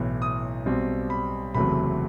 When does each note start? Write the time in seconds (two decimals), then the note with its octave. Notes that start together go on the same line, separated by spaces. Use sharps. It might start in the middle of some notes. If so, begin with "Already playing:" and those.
Already playing: B1 A2 E3
0.22 D#6
0.66 B1 B2 G3 C4
1.10 B5
1.54 F#1 E2 C3 F#3 A3 B5